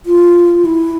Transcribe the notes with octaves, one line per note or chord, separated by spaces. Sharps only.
F4
E4